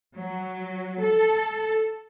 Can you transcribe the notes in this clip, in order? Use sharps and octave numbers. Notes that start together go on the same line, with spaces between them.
F#3
A4